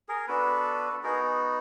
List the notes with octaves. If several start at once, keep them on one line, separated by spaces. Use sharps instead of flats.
G#4 A#4
B3 D4 F#4 A4 B4
B3 D#4 F#4 G#4 A#4